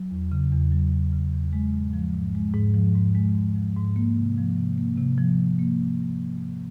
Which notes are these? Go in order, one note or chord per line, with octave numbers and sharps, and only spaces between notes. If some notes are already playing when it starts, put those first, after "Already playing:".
Already playing: F#3
E2
C#3
E2
F#3
E2
C#3
E2
G#3
G#2
F3
G#2
G#3
G#2
F3
G#2
G#3
G#2
F3
G#2
A#3
C3
F3
C3
A#3
C3
F3
C3
A#3